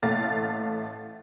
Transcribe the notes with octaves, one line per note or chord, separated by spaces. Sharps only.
A1 A3 F5 F#5 A6